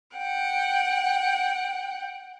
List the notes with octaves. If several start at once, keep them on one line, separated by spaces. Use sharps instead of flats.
F#5 G5